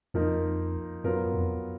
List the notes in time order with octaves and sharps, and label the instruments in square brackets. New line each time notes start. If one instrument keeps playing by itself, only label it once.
[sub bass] F2 [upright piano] F3 A#3 D#4 A#4
[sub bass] F#2 [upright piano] F#3 B3 F4 A#4
[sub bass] F2